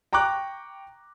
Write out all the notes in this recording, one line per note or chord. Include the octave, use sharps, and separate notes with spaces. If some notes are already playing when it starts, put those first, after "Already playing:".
G5 A#5 C#6 D6 F#6